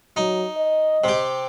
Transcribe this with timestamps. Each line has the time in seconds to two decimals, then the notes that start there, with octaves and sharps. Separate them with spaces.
0.16 F#3 D#4
0.57 D#5
1.04 C3 G4